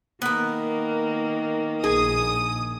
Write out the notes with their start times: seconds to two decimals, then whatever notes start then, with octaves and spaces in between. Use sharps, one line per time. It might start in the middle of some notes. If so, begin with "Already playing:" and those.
0.22 D#3 A#3 B3 A#4
1.84 A#1 G#4 D#6